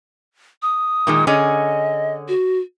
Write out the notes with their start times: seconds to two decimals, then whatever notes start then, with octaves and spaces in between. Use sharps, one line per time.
0.62 D#6
1.07 A#2 D#3 G#3
1.27 D3 C#4 G#4 D#5
2.28 F#4